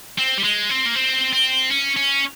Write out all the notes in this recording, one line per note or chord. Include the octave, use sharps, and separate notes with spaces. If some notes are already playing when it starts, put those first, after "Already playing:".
C4
G3
G#3
C4
A#3
C4
C4
C#4
C#4